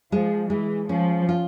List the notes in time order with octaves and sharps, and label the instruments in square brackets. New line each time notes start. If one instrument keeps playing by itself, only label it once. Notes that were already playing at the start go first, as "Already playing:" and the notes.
[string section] F3 [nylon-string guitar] G#3
[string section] E3 [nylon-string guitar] G#3
[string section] F3 [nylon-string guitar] C#4
[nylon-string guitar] F4